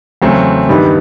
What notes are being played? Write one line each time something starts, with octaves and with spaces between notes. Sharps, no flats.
E2 C#3 F#3 A3 C4
G2 D#3 G3 B3